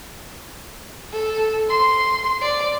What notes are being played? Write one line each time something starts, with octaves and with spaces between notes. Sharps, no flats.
A4
C6
D5